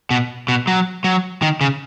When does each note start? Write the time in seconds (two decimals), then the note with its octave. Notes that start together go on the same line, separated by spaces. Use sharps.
0.11 B2
0.48 B2
0.67 F#3
1.04 F#3
1.42 D#3
1.61 C#3